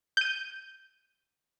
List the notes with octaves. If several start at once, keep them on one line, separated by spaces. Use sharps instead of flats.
G6 D#7